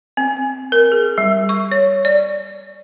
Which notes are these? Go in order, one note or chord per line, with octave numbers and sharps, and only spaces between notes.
C4
A#4
G#4
G3
C#6
C#5
D5